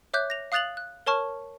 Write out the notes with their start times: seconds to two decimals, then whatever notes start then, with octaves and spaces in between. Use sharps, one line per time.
0.14 C#5 E5 D6 F#6 G6
0.30 A#6 F7
0.52 F5 D#6 F#6 A6 F7 F#7
0.77 F#6
1.06 A#4 C#5 A5 C#6 F6